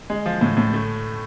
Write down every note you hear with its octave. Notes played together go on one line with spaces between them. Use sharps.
G#3
F3
A2
A2
A3